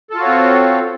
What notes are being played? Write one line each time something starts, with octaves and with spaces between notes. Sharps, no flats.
C4 F4 F#4 A4 C#5